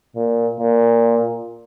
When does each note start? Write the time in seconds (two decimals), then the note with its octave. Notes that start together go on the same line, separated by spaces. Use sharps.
0.16 A#2
0.60 A#2